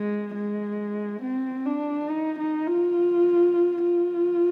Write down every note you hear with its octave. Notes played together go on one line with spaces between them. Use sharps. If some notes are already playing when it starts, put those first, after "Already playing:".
Already playing: G#3
G#3
C4
D4
D#4
D#4
F4
F4